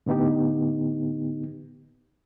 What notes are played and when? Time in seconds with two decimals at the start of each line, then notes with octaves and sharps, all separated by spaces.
0.06 A2 D3 B3 D#4 G4